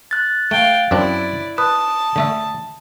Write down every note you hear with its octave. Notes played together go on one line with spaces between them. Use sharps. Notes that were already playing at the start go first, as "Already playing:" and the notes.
F#6 A6
A3 F5 G5
F#2 C4 D4 E4 D5
B4 A5 D#6
D3 A3 E5